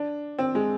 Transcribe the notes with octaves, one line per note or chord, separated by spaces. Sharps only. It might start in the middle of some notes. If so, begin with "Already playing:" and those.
Already playing: D4
C4
G#3